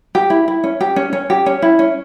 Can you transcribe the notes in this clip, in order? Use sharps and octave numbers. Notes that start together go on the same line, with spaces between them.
G4
E4
E4
C#4
G4
C#4
C#4
G4
C#4
E4
C#4